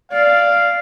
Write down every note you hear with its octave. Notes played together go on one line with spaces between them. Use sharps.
D5 F5